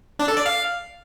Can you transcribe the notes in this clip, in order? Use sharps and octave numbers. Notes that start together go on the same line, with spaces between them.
D4
A4
D5
F5